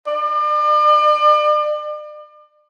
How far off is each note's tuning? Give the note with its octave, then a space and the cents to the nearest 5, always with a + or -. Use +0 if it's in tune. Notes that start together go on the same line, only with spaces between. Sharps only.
D5 +40